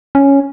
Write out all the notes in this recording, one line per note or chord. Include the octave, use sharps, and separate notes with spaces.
C#4